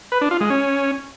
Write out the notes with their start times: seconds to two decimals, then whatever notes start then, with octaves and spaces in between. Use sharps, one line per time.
0.12 B4
0.21 D4
0.31 F4
0.41 G#3
0.50 C#4